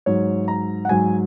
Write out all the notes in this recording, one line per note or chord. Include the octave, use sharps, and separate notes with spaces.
G#2 F#3 C#5
A#5
F#5
G#2 F#3 G#5